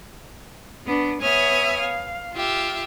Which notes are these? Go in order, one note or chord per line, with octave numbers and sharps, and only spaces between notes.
B3 D4
B3 C#5 E5 G#5 D#6 F6
F5
F4 G4 E5